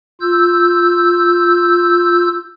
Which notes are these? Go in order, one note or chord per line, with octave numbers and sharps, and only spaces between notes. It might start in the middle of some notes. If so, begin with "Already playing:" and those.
F4 E6 G6